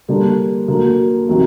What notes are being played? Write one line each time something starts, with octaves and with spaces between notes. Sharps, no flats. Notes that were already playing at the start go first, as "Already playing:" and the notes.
D3 G3 A#3 D4
D3 F#3 A#3
C3 D#3 F#3 A#3